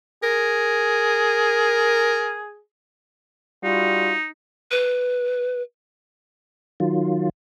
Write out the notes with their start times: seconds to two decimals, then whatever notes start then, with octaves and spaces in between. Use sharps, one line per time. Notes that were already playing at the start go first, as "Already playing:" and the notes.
0.23 G#4 A#4
3.64 G3 D#4 F4 F#4
4.71 B4
6.80 D#3 F#3 F4